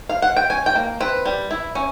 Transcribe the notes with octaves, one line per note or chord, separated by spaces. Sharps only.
F5
F#5
G5
C#4 G#5
G5
A#3
C4 B4
G3
E4
C#4